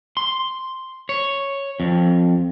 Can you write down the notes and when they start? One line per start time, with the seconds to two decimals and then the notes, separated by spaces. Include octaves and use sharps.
0.17 C6
1.09 C#5
1.80 F2